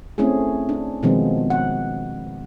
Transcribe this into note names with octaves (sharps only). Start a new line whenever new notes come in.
A3 C4 C#4 E4 G#4
D4
B2 D#3 F3 G#3 B3 C4
F#5